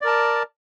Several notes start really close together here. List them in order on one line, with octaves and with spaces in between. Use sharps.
D5 A#4 A5